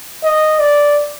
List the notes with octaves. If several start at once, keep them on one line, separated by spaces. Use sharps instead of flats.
D#5
D5